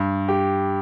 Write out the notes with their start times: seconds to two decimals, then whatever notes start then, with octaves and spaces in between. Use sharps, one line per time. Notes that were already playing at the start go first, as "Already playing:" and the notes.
Already playing: G2
0.28 G4